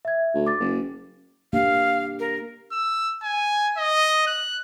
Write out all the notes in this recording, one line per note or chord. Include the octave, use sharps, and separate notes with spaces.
E5 G#6
D2
D6 A6
F#1
A#3 D4 G4 F5
A#4
E6
G#5
D#5
F#6